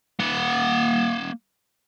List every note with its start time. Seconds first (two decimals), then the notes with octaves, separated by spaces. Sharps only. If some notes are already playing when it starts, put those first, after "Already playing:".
0.19 A#3 F#5